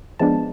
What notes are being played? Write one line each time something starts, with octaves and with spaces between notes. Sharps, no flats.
F3 G#3 B3 D4 A5